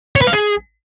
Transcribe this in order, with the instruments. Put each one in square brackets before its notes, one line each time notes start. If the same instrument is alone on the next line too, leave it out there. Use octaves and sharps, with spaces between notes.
[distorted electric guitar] C#5
B4
F5
G#4